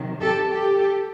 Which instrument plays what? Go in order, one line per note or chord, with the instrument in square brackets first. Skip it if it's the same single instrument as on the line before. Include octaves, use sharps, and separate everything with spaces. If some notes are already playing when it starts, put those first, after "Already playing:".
Already playing: [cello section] C3 D#3 F#3
G4 A4
G4 A4